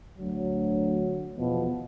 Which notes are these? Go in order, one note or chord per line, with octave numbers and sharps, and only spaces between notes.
D2 F#3
E2 B2 F3